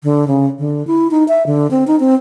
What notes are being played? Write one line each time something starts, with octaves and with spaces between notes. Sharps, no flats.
D3
C#3
D3
E4
D#4
E5
D3
C4
D#4
C4